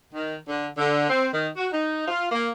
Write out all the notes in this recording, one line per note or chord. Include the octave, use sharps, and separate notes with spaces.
D#3
D3
D3
C4
D#3
F#4
D#4
F4
A#3